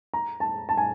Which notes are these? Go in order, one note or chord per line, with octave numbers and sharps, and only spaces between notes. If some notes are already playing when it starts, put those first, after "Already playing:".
A#5
A5
A5
G#5